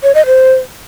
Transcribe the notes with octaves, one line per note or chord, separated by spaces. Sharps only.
C#5
D#5
C5